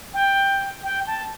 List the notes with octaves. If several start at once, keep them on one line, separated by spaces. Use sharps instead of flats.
G5
G5
A5